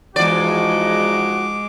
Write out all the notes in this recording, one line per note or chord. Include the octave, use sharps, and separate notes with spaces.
E2 F3 G#3 D#4 F#4 D5 D6